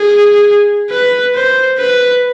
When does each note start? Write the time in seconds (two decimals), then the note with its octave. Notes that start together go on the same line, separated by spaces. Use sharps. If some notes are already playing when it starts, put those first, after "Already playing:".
Already playing: G#4
0.91 B4
1.35 C5
1.78 B4